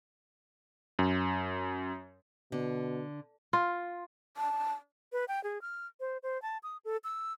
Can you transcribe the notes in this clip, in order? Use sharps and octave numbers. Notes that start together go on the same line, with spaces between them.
F#2
B2 D3
F4
A5
B4
G5
G#4
F6
C5
C5
A5
D#6
A4
E6